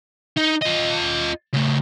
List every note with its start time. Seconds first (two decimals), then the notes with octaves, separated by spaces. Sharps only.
0.37 D#4
0.61 F4 D#5
1.53 C#3 A3